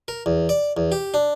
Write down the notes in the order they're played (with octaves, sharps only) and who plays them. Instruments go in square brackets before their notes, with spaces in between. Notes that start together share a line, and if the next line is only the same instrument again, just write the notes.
[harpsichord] A#4
E2
D5
E2
G4
D4